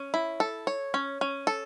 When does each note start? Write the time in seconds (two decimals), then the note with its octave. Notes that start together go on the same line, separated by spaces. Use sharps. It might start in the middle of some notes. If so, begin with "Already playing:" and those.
Already playing: C#4
0.14 E4
0.40 A4
0.67 C#5
0.94 C#4
1.21 C#4
1.47 A4